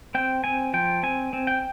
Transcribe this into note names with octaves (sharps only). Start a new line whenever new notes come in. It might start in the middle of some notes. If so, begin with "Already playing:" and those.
C4 G5
C4 G#5
F3 G5
C4 G#5
C4
G5